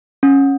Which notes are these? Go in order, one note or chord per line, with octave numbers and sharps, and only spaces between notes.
C#4